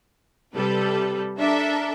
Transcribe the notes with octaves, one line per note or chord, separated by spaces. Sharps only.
C3 G3 A4 B4
D4 A4 A#4 E5